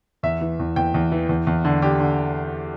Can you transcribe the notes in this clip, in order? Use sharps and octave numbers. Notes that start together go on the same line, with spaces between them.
E2 E5
E3
E2
E2 G5
E2
E3
E2
E2
D3
D3 G4
D3